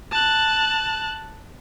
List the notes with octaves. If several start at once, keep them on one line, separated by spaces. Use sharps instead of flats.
A5 F#6